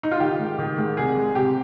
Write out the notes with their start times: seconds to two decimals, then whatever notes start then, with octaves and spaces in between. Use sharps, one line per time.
0.03 D#4
0.11 F4
0.20 D#3 G4
0.40 G#2
0.59 D#3
0.78 G#2
0.97 C2 G#4
1.16 G#3
1.35 C3 G4